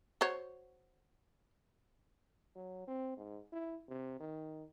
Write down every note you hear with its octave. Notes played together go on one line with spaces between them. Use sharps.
F#4 C5 C#5
F#3
C4
G#2
E4
C3
D#3